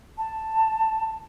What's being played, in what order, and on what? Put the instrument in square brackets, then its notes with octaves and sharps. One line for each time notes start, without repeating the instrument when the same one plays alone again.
[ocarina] A5